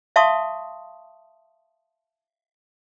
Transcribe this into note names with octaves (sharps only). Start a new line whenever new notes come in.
E5 F5 A5 C6 C#6 D#6